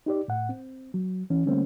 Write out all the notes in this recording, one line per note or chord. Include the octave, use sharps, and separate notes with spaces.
D#4 G4 D5
A2 F#5
C4
F#3
E3 C#4
D3 G3 A3 A#3 C4 C#4